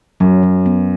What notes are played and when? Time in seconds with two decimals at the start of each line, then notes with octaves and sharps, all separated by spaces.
0.20 F#2 F#3
0.43 F#3
0.66 B3